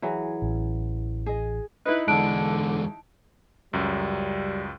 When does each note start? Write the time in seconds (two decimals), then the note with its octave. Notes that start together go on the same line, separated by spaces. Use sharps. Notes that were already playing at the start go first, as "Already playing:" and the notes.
0.02 E3 F#3 G#4
0.42 A1
1.26 G#4 D#5
1.86 D#4 E4 B4
2.08 E2 D3 G#3 A5 F#6 D7
3.73 C#2 F#2 G3